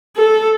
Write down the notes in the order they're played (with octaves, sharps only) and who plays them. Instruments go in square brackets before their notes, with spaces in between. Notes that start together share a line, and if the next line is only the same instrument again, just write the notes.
[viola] A4